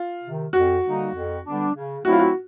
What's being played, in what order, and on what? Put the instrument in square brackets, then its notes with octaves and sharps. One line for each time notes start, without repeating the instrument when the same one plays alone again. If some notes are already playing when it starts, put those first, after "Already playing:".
Already playing: [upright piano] F4
[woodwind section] C3 D#3
[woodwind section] F2 [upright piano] F#4
[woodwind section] D3 G3 A#3 D#4
F2
D3 G3 B3 D4
C#3
[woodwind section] F#3 A3 C4 E4 [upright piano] F#4
[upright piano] F4
F#4